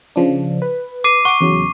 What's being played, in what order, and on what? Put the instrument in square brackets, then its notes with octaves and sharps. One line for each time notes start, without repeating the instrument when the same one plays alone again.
[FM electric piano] C#3 F3 D4
B4
[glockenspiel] D6 C7 D#7
[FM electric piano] F#5 D6 [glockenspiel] C#6
[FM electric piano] E2 C#3 F#3